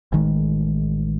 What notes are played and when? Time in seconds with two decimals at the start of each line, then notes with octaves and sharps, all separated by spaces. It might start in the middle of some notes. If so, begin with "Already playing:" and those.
0.12 A1 D#3 G#3